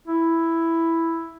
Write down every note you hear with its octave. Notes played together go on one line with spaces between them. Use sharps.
E4